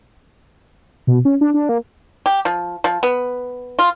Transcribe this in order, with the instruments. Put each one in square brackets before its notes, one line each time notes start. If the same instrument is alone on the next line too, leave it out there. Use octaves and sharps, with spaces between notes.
[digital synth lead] B2
C#4
D4
D4
A#3
[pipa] G4
F3
F3
B3
F4